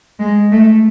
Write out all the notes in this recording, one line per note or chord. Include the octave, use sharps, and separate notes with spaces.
G#3
A3